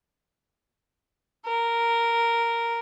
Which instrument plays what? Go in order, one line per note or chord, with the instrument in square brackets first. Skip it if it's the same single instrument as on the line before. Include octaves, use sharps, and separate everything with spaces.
[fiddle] A#4